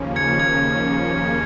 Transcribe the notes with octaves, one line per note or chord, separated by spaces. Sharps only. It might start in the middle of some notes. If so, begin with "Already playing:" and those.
Already playing: D#2 C#3 F3 A#3 C#4
G#6 C#7
G#6